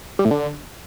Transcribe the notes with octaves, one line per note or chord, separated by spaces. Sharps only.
G3
A2
D3